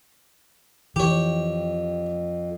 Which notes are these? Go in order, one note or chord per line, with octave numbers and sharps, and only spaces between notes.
F2 E3 G4 C#5